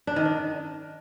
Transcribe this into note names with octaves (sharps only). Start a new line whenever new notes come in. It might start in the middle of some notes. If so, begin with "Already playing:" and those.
D4
D#3
D4